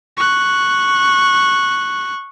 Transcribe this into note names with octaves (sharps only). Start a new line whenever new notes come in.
C#6 F#6